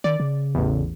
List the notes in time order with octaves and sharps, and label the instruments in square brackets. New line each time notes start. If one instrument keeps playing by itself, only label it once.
[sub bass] D#3 [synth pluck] D5
[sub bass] C#3
[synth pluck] A1 E2